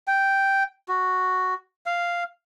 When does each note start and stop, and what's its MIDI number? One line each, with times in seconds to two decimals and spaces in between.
0.07 0.63 79
0.88 1.54 66
1.86 2.23 77